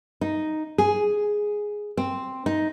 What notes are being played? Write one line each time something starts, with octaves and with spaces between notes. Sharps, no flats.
D#4
G#4
C4
D#4